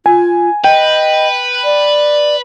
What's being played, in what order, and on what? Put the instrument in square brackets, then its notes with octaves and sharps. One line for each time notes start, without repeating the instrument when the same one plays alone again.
[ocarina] F4 [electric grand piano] G#5
[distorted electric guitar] B4 [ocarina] D#5 [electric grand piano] G5
[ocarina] D5